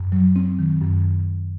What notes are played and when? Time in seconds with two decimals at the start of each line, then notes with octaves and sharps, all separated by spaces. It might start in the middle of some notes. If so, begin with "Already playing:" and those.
Already playing: F#2
0.12 F#3
0.36 C4
0.59 D#3
0.81 F#2